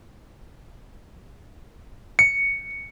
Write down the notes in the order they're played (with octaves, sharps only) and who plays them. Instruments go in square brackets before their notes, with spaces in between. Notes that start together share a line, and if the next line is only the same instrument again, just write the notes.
[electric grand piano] C#7